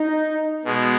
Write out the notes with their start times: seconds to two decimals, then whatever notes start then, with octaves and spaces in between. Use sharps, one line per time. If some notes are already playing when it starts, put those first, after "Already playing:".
Already playing: D#4
0.65 B2 G#3